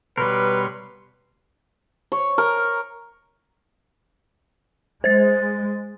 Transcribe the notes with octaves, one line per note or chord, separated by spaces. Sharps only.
B2 G3 A#4 B4 C#5 C6
C#5
A#4
G#3 C5 A6